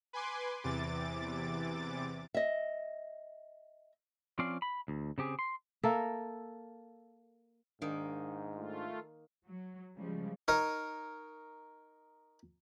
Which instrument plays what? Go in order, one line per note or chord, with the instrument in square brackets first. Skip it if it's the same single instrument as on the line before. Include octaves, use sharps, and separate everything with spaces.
[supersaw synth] B4 G#5 C6 D6
E2 C3 E3 D6 A6
[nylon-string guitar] D#5 E5
[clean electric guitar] F3 C4 C#4 D5 F5
B5
D2
C#3 C4 G4 G#4
C6
[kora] A#3 A4 A#4 E5
[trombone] G#2 [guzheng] D#3 A#3 D#4 [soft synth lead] D4
[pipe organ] A3 F4
[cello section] F#3
C#3 F3 G3 G#3
[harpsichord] D#4 A#4 C#5 D#5